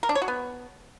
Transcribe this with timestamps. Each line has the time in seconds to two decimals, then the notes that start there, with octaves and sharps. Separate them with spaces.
0.03 A#4
0.09 D4
0.15 C#5
0.22 F#4
0.28 B3